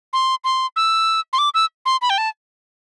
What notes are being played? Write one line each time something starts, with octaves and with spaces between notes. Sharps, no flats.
C6
C6
E6
C6
D6
E6
C6
B5
G5
A5